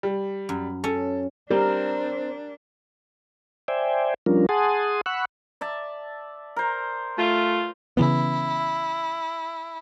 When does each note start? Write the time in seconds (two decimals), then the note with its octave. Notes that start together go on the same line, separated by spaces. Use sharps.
0.03 G3
0.49 F#2
0.84 C#4 A4
1.51 G3 C4 D4 A#4
3.68 C5 D5 E5 G5 G#5
4.26 F3 G3 C#4 D4 F4 A#4
4.49 G#4 F#5 G#5 A5 C6 D#6
5.06 F#5 B5 C#6 E6 F#6
5.61 D5 E5 A5
6.56 A#4 C5
7.17 A3 F4
7.97 C#3 E3 B3 E4